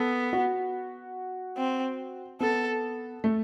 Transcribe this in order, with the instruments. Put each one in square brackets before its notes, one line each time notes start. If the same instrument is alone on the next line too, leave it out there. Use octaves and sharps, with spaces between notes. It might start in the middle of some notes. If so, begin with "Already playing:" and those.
Already playing: [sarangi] B3 [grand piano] A4
[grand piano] F#4
[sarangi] C4
[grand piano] B3 [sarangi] A4
[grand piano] A3